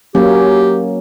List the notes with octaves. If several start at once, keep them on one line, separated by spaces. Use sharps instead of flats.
F#3 A#3 C#4 G4